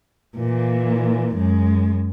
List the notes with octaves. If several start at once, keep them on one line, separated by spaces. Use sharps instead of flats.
A#2 E3
F#2 G#3